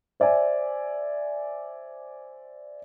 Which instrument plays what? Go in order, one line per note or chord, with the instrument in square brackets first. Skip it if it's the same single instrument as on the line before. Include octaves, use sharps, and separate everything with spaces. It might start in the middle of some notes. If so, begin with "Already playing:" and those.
[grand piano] C5 D5 E5 G#5